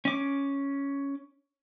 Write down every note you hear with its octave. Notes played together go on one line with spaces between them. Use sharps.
C#4 D6